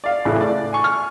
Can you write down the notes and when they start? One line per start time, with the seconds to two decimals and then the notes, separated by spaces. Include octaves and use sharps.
0.04 D5 F5
0.25 A1 A2 C#3 E4 F#6
0.41 D5
0.73 G#5 C#6
0.84 F6